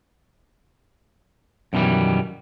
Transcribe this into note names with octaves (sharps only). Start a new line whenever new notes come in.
F#2 B2 D#3 E3 G3